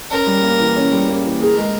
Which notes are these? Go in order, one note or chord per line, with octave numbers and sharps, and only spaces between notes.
C#4 A#4
G3
A#3
E3
C#4
G3
A#3
E3
G#4 A#4
G#3